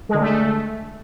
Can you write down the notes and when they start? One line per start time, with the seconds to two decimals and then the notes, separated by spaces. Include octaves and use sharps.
0.09 G#3
0.14 D3
0.19 A3